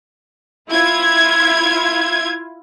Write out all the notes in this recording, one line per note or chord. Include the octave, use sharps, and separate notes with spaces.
E4 F4 G#6